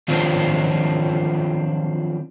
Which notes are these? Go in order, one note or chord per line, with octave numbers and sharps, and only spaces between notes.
D#3 F3 F#3 C4 D4 F4